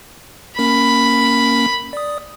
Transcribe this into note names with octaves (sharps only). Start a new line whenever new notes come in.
A#3 C#4 A#4 B5
D5 D#6